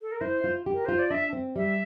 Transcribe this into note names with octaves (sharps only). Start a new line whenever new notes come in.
A4
A#4
E4 C5
F4
G4
A#4
F4 C5
D5
D4 E5
C4
G3 E5